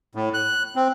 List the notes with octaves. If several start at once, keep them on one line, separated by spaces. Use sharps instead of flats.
A2
F#6
C4